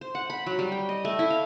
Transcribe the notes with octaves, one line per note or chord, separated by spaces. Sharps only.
C5
F#5
B5
F#3
G3
G5
D#5
A3
E4
F5